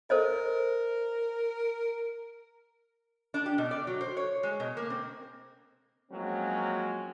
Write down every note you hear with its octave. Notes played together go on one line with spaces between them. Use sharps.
A4 A#4 C5 D#5
D4
G4
B2
D5
F#3
C5
C#5
G#3
B2
A#3
C4
F3 F#3 G#3 A#3 C4 C#4